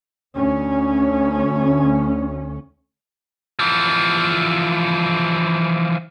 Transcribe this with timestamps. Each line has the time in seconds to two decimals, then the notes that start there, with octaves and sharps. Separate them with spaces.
0.35 D2 C#4
3.59 E3 F3